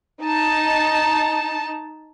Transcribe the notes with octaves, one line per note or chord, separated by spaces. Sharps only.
D#4 A5